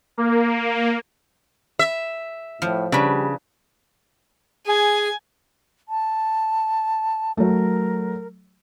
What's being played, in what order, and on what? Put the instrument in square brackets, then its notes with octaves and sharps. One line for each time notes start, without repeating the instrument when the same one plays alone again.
[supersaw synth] A#3
[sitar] E5
[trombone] A2 [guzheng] F3
[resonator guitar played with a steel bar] C#3 [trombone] G3 [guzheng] D4 B4
[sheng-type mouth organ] G#4 [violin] G#5
[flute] A5
[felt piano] F#3 A3 [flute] A#4